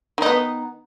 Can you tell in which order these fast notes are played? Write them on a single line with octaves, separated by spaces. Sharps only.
D#3 D#4 B3